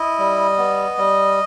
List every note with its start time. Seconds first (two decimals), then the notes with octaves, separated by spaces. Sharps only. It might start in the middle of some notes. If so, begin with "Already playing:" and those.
Already playing: E4 D#5
0.19 G3
0.58 B3
0.98 G3